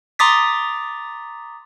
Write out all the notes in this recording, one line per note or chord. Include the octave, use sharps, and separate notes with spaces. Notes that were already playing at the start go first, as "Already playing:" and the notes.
A#5 C6 D6 D#6 A6 B6